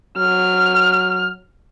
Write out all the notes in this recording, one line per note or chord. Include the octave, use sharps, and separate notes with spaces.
F#3 F6